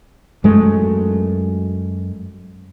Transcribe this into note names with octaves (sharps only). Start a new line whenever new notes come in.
F#2 G#3 A3